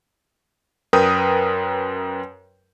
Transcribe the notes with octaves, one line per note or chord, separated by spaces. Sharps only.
F#2 A#4 B4 G5 D#6